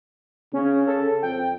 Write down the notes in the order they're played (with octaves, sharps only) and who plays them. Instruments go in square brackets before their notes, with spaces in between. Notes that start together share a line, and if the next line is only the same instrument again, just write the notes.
[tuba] C#3 [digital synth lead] C#4
[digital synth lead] A4
[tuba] F2 [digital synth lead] G5